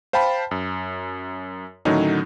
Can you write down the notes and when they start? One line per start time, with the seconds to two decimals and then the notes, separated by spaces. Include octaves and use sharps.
0.13 C5 F5 G5 A5 B5
0.51 F#2
1.85 A2 D3 D#3 F#3 C#4 D#4